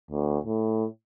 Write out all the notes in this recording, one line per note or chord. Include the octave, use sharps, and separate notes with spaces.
D2
A2